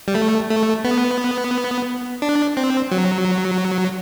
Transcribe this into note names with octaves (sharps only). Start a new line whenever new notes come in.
G3
A3
A3
B3
D4
C4
F#3